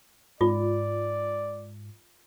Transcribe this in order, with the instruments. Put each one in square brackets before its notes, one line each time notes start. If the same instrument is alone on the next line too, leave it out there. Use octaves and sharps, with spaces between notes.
[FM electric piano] G#2 [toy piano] F4 [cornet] D5